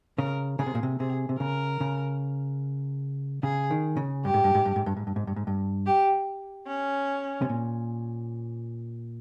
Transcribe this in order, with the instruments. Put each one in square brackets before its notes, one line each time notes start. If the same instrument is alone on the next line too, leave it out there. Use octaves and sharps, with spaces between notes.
[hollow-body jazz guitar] C#3 [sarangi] A#4
[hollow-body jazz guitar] C#3 [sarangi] G#4
[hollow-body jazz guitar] C3
A#2
C3
[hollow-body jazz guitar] C3 [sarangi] G#4
[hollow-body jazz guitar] C3
[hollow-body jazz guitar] C#3 [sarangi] A#4
[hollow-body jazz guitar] C#3
[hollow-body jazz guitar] C#3 [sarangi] G#4
[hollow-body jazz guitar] D#3
C#3
[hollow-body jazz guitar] G2 [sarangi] G4
[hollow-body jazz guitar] G#2
G2
G#2
G2
G#2
G2
G#2
G2
G#2
G2
G#2
G2
[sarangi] G4
C#4
[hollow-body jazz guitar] C3
A#2